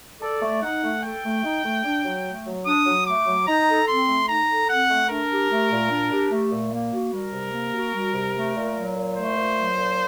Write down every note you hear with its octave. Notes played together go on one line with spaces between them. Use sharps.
A4 D5
A3
D#4 F#5
A3
A4 G5
A3
D#4
A3
D4
F#3
A3
F#3
D4 D#6
F#3
A3 D6
F#3
D#4 A#5
A4
C4 C6
A3
D#4 A#5
A4
C4 F#5
A3
D4 A#4
G4
A3
A#2
D4
G4
A3
A#2
A#3
F#4
G3 A#4
C3
A#3
F#4
G3
C3
A3
A#2
F#3
A#2
A3 C5
A#2
F#3
A#2